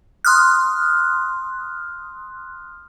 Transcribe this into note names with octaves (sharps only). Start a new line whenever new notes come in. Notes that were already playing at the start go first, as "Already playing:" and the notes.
C6 D#6 F6 F#6